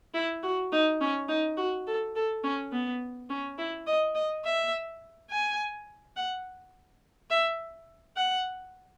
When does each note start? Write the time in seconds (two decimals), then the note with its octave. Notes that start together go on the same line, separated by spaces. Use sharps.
0.14 E4
0.43 F#4
0.72 D#4
1.01 C#4
1.28 D#4
1.57 F#4
1.87 A4
2.16 A4
2.44 C#4
2.72 B3
3.30 C#4
3.58 E4
3.87 D#5
4.15 D#5
4.45 E5
5.30 G#5
6.16 F#5
7.30 E5
8.17 F#5